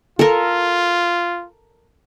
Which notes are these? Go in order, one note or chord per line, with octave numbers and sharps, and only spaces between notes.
F4 A4 A#4